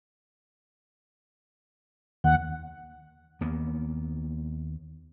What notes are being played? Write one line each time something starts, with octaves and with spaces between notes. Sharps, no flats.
D#2 D#3 F#5
D#2 A#3 B3